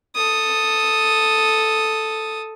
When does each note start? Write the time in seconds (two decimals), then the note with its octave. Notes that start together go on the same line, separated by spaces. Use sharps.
0.15 A4 D#6